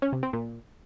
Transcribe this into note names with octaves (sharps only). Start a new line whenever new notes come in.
C#4
C3
C4
A#2